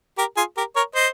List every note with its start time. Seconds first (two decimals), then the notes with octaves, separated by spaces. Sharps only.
0.18 G4 A#4
0.37 F4 G#4
0.57 G4 A#4
0.76 A#4 C#5
0.95 C5 D#5